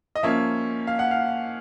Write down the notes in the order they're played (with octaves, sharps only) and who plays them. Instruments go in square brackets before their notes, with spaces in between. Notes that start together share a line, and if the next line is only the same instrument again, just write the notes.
[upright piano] D#5
F3 A#3 C#4 E5
F5
F#5
F5